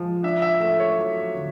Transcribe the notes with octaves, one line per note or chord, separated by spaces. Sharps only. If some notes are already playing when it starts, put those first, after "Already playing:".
Already playing: F3 G#3
D4 E5
E5
A3 E5
C#5
F#3
D3